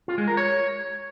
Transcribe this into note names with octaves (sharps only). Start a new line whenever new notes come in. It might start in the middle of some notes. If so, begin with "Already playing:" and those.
F4
G#3
A#4
C#5